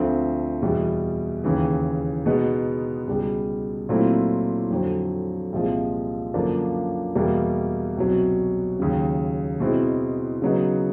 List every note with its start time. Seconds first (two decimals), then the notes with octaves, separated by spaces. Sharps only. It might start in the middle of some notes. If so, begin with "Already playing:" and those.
Already playing: D2 D3 F3 A3 C4
0.62 E2 B2 G3
1.44 D#2 C#3 E3
2.26 B2 G#3 B3 D#4
3.07 C#2 B2 G3
3.89 A#2 F#3 A3 C4 E4
4.70 F2 D3 F#3
5.52 C2 A#2 F3 G#3
6.34 F#2 D3 F3 A#3 D4
7.15 E2 B2 G3 A#3
7.97 C2 B2 F#3
8.78 D#2 C#3 F#3
9.60 B2 G#3 C4 E4
10.42 C#3 F#3 B3 D#4